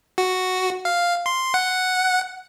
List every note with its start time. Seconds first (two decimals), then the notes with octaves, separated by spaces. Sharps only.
0.18 F#4
0.85 F5
1.26 C6
1.54 F#5